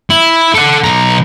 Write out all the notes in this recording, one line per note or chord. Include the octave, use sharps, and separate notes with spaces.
E4
A4 F#5
B1 A#5